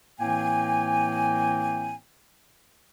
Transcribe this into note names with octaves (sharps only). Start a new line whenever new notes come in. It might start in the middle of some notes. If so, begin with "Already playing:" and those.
A2 E3 A#3 C4 G5 G#5